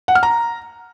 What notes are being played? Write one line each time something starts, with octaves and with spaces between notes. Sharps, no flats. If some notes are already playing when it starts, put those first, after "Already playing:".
F#5
F6
A#5